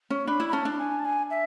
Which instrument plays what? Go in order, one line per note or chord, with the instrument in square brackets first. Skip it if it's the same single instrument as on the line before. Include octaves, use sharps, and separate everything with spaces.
[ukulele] C#4
[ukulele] D4 [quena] B5
[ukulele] E4
[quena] B5
[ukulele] C#4 [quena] A5
[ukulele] D4
[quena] G#5
A5
G#5
E5